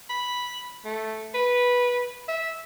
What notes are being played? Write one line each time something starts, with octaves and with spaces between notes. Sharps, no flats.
B5
A3
B4
E5